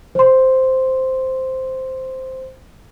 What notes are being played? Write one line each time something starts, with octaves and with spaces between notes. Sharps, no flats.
C5 C6